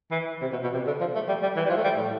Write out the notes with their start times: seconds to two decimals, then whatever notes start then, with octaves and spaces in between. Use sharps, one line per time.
0.11 E3
0.42 C3
0.52 B2
0.63 B2
0.73 C3
0.87 D3
1.00 F3
1.15 A3
1.28 G3
1.43 G3
1.56 E3
1.66 G3
1.70 F3
1.77 A3
1.84 G3
1.97 A2